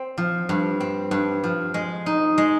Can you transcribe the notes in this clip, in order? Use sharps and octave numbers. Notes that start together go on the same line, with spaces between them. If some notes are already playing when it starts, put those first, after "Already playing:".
Already playing: C4
F3
G2
C4
G2
F3
G#3
D#4
G#3